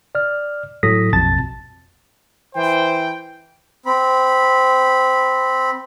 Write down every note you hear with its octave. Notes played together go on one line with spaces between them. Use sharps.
D5 F6
A2 F#3 A4 D#6 A#6 B6
A#1 F2 B2 A5 A6
E3 C5 G5
C4 B5